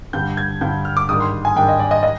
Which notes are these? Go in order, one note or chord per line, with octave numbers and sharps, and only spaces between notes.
G2 D3 G3 G6
G#6
G2 D3 G3 G6
F6
D6
G#2 D#3 G3 D4 D#6
C6
G#5
G#2 D#3 G3 D4 G5
D#5
D5
D#5
D#5